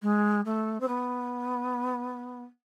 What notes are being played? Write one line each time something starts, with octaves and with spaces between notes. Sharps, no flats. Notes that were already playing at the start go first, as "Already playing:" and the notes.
G#3
A3
C4
B3